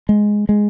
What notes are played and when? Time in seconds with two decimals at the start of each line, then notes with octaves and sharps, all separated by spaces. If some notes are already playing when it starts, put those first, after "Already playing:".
0.09 G#3
0.49 G#3